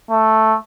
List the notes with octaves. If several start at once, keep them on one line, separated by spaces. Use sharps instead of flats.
A3